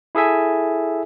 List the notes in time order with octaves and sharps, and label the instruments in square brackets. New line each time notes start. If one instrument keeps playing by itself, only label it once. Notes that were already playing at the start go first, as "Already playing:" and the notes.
[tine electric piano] E4 G#4 A4 E5 G#5